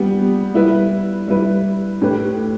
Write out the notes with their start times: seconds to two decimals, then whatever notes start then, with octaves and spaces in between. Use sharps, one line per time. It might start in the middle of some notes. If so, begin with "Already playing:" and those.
Already playing: G3 B3 G4
0.54 G3 E4 B4
1.27 G3 E4 B4
2.02 A2 A3 G4 B4